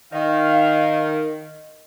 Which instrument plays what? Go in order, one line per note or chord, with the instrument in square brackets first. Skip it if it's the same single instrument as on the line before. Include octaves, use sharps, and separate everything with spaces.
[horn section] D#3 [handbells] D#5 [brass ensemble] F5